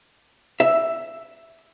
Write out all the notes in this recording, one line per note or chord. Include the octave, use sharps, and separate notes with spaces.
E5